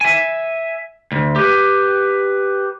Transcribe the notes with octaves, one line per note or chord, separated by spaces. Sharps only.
E5 G#5
D2
G4 B4